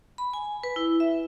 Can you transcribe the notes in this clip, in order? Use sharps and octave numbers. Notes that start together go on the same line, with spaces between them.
B5
G#5
B4
E4
E5